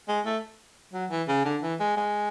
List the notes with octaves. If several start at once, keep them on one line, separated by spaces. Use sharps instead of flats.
G#3
A3
F#3
E3
C#3
D3
E3
G#3
G#3